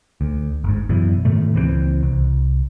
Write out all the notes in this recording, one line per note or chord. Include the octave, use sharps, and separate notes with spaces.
D2
G1 G#2
F#2 B2 E3
G#2 B2 D#3 A3
C#2 E3 F#3 C4
C2